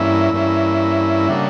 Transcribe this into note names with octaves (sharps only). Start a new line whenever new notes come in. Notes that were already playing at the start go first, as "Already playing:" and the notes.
Already playing: G2 E3 A#3 C#4 E4 E5
G2 E3 A#3 C#4 E4
C#3 G3 A#3 D4 F#5